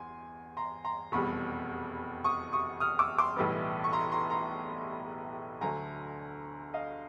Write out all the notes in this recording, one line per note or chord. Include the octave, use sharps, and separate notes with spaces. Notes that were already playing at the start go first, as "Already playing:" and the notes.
Already playing: E2 G#5 C6
A#5 C6
A#5 C6
F1 E2 B2 G3 B5 C#6
C#6 D#6
C#6 D#6
D#6 F6
D6 E6
C6 D6
B1 A2 E3 G3 B3
C#6
A#5 C6
A#5 C6
A#5 C6
D2 D3 F#3 A3 G#5 A#5
D#5 F5